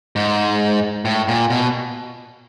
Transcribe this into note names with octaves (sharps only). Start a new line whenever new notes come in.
G#2
A2
A#2
B2